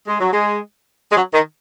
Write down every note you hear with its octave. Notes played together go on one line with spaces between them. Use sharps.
G#3
F#3
G#3
G#3
F#3
D#3